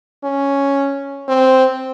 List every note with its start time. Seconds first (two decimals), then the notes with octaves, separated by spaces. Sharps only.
0.24 C#4
1.28 C4